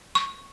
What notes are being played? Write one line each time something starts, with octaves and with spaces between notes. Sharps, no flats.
C#6